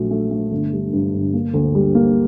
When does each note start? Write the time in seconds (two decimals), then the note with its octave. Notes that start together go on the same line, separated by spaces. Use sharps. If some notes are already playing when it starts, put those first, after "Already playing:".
Already playing: A#1 F#3 A3
0.11 A3
0.31 A3
0.52 G1
0.72 G3
0.93 G2
1.14 G1
1.34 A#3
1.54 D2
1.75 G3
1.95 A#3